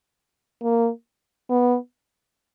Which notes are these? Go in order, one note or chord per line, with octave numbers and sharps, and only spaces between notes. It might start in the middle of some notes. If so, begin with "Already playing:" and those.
A#3
B3